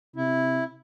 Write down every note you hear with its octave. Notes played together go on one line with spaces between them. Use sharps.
C3 E4